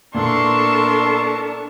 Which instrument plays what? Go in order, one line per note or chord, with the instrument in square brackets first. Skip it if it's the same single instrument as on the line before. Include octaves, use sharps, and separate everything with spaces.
[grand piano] A#2 [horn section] B3 E4 C6 [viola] D4 A4 [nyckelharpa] A#4 C#6